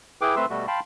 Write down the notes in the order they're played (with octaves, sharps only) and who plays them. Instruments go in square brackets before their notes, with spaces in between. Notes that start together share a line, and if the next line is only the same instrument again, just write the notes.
[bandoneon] E4 G#4 B4 G5 D6
A3 C4 B4 E5 C6 E6
B2 G3 A3 F#4
F5 G5 A5 B5 C6